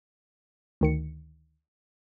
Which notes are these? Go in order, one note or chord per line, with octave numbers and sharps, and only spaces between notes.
D2 D#3 C#7